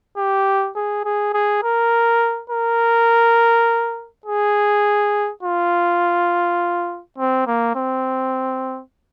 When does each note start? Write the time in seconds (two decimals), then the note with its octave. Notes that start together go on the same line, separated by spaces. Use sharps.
0.17 G4
0.76 G#4
1.05 G#4
1.34 G#4
1.63 A#4
2.50 A#4
4.26 G#4
5.43 F4
7.19 C4
7.47 A#3
7.76 C4